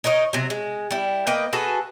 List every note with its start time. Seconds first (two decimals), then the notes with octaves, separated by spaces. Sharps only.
0.04 D#4 A#4 C#5 D#5
0.33 C3 F#3
0.50 G#3
0.91 G3 E4
1.27 A#3 B4 D#5 G5
1.53 F#4 G#4 A4 B4